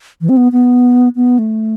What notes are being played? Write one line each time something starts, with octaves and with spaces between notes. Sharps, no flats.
E3
C4
B3
B3
B3
A3